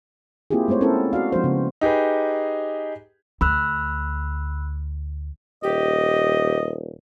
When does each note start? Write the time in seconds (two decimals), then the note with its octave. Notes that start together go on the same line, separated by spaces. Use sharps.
0.51 A#3 C4 E4 F4 G4 G#4
0.68 G#3 A3 B3 C5 C#5
0.81 C4 C#4 E4 A4 A#4 C5
1.13 F#4 D5 F5
1.32 F3 G#3 C4 D4 F#4 C5
1.44 C#3 B3
1.81 D#4 G4 G#4 B4
3.41 D2 B5 E6 F#6
5.63 D#1 G4 D#5